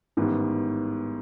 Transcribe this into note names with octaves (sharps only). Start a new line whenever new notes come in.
A1 G#2 D#3 G3 B3